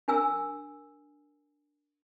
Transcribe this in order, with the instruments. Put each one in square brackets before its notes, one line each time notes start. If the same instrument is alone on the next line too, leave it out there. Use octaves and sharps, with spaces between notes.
[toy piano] D4 A#4 G#5 E6